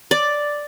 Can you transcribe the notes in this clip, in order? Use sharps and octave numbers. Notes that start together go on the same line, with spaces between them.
D5